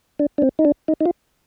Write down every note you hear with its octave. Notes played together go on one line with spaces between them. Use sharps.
D4
D4
C4
D#4
D4
D#4
D#4
F4